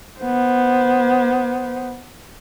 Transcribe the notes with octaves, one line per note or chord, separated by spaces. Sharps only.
B3 C5